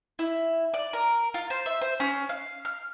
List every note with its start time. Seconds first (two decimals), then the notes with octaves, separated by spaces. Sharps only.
0.19 E4
0.74 D5
0.93 A#4
1.34 F4
1.50 C5
1.66 E5
1.81 C5
2.00 C#4
2.29 F5
2.65 F6